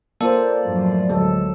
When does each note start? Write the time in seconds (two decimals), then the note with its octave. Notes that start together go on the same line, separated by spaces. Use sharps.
0.21 A#3 F4 A4 C5 D5
0.63 F#2 A2 F3
1.09 D2 F#3 G#3 A4